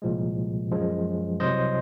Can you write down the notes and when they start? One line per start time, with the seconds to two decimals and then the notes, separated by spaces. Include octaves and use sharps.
0.02 C2 A#2 F3 G#3
0.71 F#2 F3 G#3
1.40 C2 C3 F#3 C5 D#5